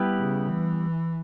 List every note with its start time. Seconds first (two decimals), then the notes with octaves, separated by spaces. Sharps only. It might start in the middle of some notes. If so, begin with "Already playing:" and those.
Already playing: G3 B3 E4 G4 B4
0.17 C#3
0.48 E3